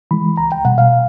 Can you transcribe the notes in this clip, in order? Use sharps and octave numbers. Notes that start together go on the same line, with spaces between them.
E3 G#3 B5
C#2 A#5
G5
B2 G3 F#5
F5